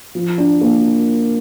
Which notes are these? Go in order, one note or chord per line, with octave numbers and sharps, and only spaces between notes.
F3
D4
A#3